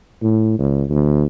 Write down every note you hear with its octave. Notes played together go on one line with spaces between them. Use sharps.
A2
C#2
D2